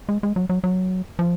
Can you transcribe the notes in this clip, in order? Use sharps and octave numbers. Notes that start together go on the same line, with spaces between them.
G#3
G#3
F#3
F#3
F#3
F3